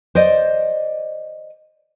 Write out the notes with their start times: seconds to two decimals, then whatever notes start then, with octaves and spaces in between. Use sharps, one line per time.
0.15 C5 D5 D#5